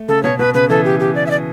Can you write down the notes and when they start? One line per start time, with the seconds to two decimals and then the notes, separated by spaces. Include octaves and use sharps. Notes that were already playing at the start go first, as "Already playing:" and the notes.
Already playing: A3
0.08 C#3 A4
0.23 B2 C#5
0.39 B2 B4
0.54 C#3 B4
0.69 E3 A4
0.85 G4
1.00 G4
1.15 D5
1.26 E5
1.31 D5